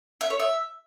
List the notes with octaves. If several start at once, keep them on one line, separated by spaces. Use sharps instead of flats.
E5
C#5
E5